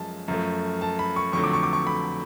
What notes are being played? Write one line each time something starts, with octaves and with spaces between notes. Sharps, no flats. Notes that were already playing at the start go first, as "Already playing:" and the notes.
Already playing: F#2 F3 G#3 A5
F#2 F3 A3
A5
B5
C#6
F2 D3 F#3 A3 C#6
D6
C#6
D6
C#6
B5